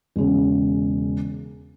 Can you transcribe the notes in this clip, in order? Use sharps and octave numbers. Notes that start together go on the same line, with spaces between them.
E1 C#3